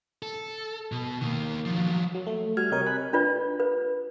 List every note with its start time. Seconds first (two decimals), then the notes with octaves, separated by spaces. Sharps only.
0.23 A4
0.92 B2
1.21 D#3 A#3
1.65 F3 F#3
2.15 F#3
2.27 A3
2.57 G3 F#4 F6 G#6
2.72 C3 A#4 C#5 D#5 G5
2.87 G#5 B5 F#6
3.13 D4 F4 B4 D5
3.60 B4